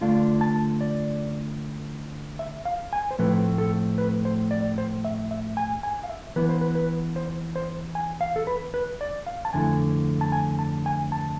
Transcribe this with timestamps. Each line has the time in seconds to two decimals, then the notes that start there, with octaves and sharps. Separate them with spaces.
0.01 D3 A3 D4 F4 F5
0.41 A5
0.81 D5
2.39 E5
2.65 F5
2.93 G#5
3.11 C5
3.19 A2 F3 A3 C4 B4
3.58 A4
3.98 B4
4.25 C5
4.51 D5
4.78 C5
5.05 E5
5.31 E5
5.57 G#5
5.83 G#5
6.04 F5
6.09 E5
6.36 E3 B3 E4 B4
6.49 C5
6.61 B4
6.75 B4
7.16 C5
7.56 C5
7.95 G#5
8.21 F5
8.36 A4
8.47 B4
8.74 B4
9.01 D5
9.26 F5
9.45 A5
9.53 F2 D3 A3 E4 G#5
10.21 A5
10.32 G#5
10.59 A5
10.86 G#5
11.12 A5